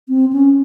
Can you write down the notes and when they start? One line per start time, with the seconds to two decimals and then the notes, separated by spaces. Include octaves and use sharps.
0.09 C4
0.33 C#4